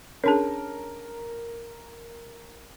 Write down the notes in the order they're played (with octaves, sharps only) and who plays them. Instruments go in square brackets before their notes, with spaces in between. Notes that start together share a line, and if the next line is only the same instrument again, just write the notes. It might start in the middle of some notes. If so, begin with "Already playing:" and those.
[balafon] C#4 D4 G#4 [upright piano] A#4 [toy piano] C#5 A5